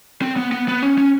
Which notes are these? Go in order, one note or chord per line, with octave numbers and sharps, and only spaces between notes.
C4
B3
B3
B3
C#4
C#4